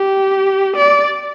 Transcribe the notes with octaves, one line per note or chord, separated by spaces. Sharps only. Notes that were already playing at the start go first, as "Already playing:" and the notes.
Already playing: G4
D5